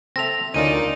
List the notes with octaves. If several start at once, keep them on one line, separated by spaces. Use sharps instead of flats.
C4 A4 E5 A#6 F7
D2 C#4 D#4 F4 A#4 D5 D#7